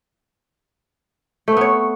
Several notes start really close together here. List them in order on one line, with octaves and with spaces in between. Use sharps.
A3 C4 B3 C#5